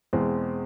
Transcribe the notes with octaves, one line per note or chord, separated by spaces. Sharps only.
E2 B2 G#3 C4